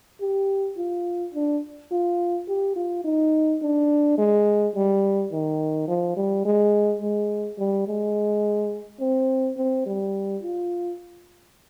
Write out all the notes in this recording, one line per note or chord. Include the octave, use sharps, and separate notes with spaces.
G4
F4
D4
F4
G4
F4
D#4
D4
G#3
G3
D#3
F3
G3
G#3
G#3
G3
G#3
C4
C4
G3
F4